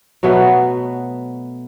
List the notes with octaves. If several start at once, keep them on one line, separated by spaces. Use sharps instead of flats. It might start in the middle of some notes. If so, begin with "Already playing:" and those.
B2 F#3 A3 B3